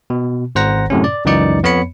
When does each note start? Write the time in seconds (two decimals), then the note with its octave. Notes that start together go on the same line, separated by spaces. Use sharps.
0.10 B2
0.55 G#1 C5 F#5 A#5 A#6
0.90 F#2 A2 C3 C#4
1.04 D5
1.25 C#2 F#2 E3 D#4 D5 C#7
1.63 F2 B3 C#5 B5 C#7